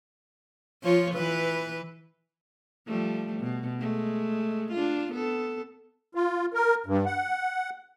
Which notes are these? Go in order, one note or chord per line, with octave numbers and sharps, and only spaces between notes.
F3 F4 C#5
E3 B4
F3 G3 A3
B2
G#3 A3
D4 F4
B3 A4
F4
A#4
G2
F#5